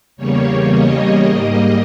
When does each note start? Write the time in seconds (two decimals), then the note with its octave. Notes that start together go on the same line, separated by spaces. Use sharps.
0.17 E2 C#3 G3 A#3 C#5
0.71 D#5
1.23 G#2 G3 A#3